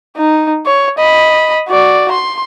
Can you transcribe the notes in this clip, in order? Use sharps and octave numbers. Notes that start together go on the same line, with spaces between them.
D#4
C#5
D#5 B5
F#4 D5
C6